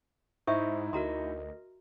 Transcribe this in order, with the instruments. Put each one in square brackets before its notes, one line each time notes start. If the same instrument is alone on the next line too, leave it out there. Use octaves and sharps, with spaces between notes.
[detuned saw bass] G#2 [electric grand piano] D#4 E4 [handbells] C5 [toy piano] E5 C#6
[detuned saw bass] D2 [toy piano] F#4 A#5 C6 [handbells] A#4 D#5